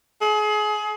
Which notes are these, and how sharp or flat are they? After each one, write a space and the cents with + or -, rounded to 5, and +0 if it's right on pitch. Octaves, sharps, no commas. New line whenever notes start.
G#4 +30